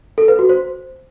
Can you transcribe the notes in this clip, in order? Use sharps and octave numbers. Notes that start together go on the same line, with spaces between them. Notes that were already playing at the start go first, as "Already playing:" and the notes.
A4
B4
F#4
C5